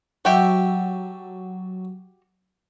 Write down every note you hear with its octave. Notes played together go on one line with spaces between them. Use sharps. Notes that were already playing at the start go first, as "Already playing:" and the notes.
F#3 F#4 G4 A4 E5